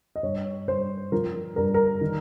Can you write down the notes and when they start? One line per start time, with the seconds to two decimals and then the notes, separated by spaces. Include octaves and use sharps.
0.16 D#5
0.23 G2 C#5
0.67 G2 C5
1.12 F3 A#4
1.56 G2 A#4
1.74 A#4
2.01 D#3